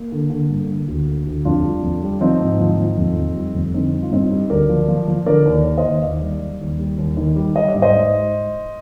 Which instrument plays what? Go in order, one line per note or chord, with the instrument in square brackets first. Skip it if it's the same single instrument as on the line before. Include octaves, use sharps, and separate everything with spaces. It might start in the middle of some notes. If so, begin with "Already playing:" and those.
Already playing: [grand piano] A#3
D3
D3
G2
D3
D2
D3
D2
F2 D4 F4
G3
F2
G3
F3 C4 D#4
G#2
F3
F3
F2
F2
G3
F2
D3 C4 D#4
G3
F4
G2 C4 D#4
G3
D2 A#4 D5
F3
F3
F3
D3 A#4 D5
D#2
D#2
C5 D#5
D#2
D#2 D5 F5
G3
G3
D#2
G3
D#2
D#3
G3
G3 D#5
D5
G#2
C5 D#5
G#2